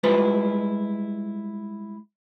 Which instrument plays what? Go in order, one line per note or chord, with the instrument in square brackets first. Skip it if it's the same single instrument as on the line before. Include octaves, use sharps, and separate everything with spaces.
[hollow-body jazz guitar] G3 G#3 E4 F4 B4 C5